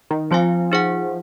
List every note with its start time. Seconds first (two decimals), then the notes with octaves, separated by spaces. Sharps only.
0.11 D#3
0.31 F3 C4 F4 C5 F5 G#5
0.72 D#4 G#4 C5 F#5